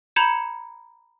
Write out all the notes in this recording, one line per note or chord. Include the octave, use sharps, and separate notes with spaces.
A#5 B5 G6 G#6 C#7 E7